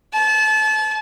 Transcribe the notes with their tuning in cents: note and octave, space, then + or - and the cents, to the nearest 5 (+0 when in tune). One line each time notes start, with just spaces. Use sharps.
A5 -30